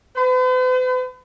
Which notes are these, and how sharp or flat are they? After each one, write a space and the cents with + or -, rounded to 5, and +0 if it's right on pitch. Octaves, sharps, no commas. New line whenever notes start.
B4 +45